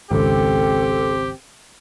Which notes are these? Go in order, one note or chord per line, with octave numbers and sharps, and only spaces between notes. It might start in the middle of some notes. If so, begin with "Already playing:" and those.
G#1 C#2 C4 G4 A4